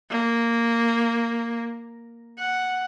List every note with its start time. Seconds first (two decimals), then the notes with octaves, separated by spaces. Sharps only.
0.11 A#3
2.39 F#5